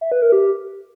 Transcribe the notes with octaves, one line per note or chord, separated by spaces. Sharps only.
E5
B4
A#4
G4